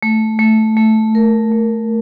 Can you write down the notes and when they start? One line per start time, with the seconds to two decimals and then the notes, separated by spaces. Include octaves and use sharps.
0.03 A3
0.39 A3
0.77 A3
1.15 A#4
1.52 A3